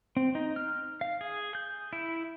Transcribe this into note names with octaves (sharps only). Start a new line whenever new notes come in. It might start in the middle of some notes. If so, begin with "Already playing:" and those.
C4
D#4
F6
F5
G#4
G6
E4